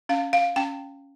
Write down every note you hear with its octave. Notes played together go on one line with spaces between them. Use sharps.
C#4 F5
F5
C#4 G5